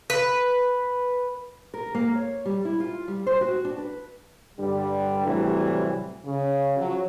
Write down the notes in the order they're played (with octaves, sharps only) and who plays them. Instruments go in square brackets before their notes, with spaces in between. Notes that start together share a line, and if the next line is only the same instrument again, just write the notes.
[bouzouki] B4
[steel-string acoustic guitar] A#4
A#3
C#5
G3
E4
F4
G3
C5
F#4
D4
B4
[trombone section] G2 D3 G3
A2 C3 E3 F#3 G3
[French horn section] C#3
F3 F#3